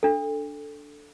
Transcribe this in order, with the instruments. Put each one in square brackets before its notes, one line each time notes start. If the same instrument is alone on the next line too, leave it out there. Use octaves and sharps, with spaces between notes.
[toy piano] D4 A4